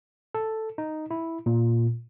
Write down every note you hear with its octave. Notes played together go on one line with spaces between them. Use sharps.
A4
D#4
E4
A#2